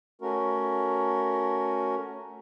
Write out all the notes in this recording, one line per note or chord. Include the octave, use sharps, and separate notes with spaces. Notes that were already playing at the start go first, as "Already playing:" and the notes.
A3 C#4 F#4 A#4